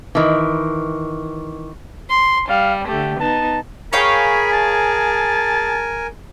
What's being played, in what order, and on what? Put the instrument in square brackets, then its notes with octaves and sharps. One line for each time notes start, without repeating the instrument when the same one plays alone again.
[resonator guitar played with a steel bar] D#3 E3
[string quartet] C6
[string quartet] G3 [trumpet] F5
[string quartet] D3 A3 [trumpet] G4
[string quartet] B3 D#4 [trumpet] A5
[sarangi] G#4 [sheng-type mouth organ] A#4 G#5 [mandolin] C#5 F5 G5 [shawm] B5
[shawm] A5